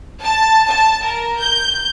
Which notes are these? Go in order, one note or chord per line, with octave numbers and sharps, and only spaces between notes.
A5
A5
A#4
G6